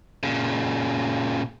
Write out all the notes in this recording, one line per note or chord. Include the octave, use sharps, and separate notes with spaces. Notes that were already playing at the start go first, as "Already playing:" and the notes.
A#2 C#3